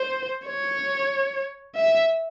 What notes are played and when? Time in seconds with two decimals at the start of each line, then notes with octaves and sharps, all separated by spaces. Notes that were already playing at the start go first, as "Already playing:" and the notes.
Already playing: C5
0.46 C#5
1.76 E5